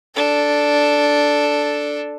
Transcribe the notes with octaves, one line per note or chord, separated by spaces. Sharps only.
D4 A4